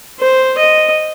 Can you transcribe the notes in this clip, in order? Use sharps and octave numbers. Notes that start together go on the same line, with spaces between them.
C5
D#5